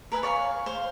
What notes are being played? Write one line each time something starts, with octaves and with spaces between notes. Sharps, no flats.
A#4 B4 E5 G#5
C#5 D5 F5 G#5
C5 F5